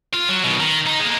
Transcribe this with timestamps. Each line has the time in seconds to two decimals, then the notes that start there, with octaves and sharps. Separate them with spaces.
0.13 F4
0.29 F#3
0.44 B2 D#3
0.60 D#3
0.86 D#4
1.00 G#3 A#3